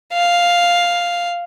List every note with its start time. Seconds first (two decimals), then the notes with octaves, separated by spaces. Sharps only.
0.13 F5